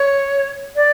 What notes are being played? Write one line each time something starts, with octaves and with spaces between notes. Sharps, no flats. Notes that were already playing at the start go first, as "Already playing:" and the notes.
Already playing: C#5
D5